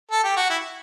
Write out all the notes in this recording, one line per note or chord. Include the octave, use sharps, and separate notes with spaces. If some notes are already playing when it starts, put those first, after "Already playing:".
A4
G4
F#4
E4